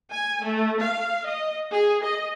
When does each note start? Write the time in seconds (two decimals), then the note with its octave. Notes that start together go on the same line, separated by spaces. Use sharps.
0.12 G#5
0.43 A3
0.81 F5
1.27 D#5
1.71 G#4
2.03 D#5